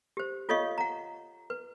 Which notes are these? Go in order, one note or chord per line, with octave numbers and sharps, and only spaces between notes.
G4 C5
F4 A4 C#5 D#5 F5 C#6
F#5 A#5
B4